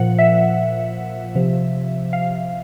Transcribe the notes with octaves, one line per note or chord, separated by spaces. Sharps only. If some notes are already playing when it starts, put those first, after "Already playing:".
Already playing: A#2 F3 F#5
E5
C3 F3
F5